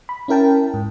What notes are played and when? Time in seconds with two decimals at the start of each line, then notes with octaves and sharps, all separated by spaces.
0.09 B5
0.28 C#4 E4 A#4 G5 A5
0.74 G#2